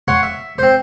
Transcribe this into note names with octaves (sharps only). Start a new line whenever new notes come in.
C#5 F#5 C6
E5
C4 C5